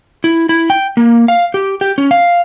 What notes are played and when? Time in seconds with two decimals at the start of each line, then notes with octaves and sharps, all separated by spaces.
0.24 E4
0.49 E4
0.70 G5
0.97 A#3
1.28 F5
1.54 G4
1.81 G4
1.98 C#4
2.11 F5